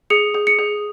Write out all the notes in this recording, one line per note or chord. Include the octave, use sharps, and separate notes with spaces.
G#4 C#7
G#4
C#7
G#4